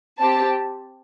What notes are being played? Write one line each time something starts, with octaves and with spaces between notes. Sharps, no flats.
C4 G4 A5